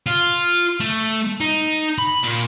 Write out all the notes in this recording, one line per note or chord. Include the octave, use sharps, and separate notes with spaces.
F4
A3
D#4
B5
A#2